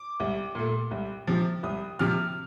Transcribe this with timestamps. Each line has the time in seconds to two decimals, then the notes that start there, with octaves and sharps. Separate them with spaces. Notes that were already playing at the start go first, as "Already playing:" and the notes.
Already playing: D6
0.20 C2
0.55 A#2 A3
0.91 C2
1.27 C3 F3
1.63 C2 D#6
1.99 C3 F3 F6